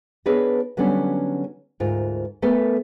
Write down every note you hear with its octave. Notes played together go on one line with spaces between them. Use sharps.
B3 D4 G#4 B4 C#5 D#5
D3 F#3 G3 B3 C#4 D4
D2 G#2 F4 A#4
A3 B3 A4 A#4 G#5